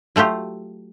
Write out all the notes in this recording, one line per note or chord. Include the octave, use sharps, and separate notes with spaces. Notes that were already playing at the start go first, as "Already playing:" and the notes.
F#3 A3 F4 G4